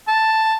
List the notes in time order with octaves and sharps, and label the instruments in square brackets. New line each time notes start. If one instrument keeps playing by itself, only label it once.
[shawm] A5